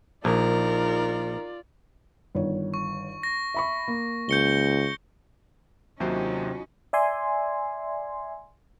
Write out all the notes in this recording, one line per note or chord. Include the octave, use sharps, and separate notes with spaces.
A#1 D#4 F4 A#4 D5
G1 D#3 C#5
C#6
A#6
E5 B5 C#6
A#3
C#2 G6 C#7 G7
D#2 C3 F#3 C#4 D#4 F4 F#4 C5
D5 E5 G#5 C6